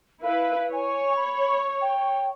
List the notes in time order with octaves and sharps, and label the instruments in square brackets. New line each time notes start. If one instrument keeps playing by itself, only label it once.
[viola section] E4 B4 [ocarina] F5
[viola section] C#5 [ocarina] G#5
[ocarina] B5
G5